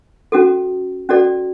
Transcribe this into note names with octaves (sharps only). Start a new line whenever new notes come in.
C#4 F#4 A4
C#4 F#4 A4 D5